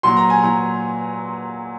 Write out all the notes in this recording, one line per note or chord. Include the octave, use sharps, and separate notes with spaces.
A#2 F#3 C6
A#5
G#5
A#2 F#3 A#5